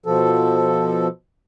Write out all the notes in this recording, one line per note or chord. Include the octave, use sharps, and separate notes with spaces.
B2 F3 A4